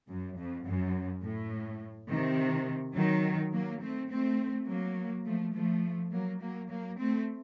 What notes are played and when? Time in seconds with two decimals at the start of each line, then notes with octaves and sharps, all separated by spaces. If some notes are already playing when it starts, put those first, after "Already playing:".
0.08 F#2
0.37 F2
0.65 F#2
1.22 A2
2.09 C3 D#3
2.96 D#3 F#3
3.53 F#3 A#3
3.81 A3 C4
4.10 A3 C4
4.68 F#3 A#3
5.25 F3 A3
5.54 F3 A3
6.11 F#3 A#3
6.41 F#3 A#3
6.69 F#3 A#3
6.98 A3 C4